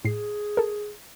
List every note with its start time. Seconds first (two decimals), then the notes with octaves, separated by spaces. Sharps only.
0.05 A2 G#4 C7
0.57 A4 A#4